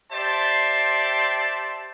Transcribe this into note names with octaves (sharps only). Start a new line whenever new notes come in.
G4 C5 D5 E5 A5 C6